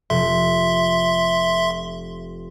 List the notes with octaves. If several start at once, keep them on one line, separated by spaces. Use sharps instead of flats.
F1 E5 C6